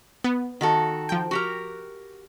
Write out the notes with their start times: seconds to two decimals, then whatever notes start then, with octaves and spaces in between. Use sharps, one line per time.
0.24 B3
0.61 D#3 F#4 A4
1.09 F3 G5
1.31 F#4 G4 A#4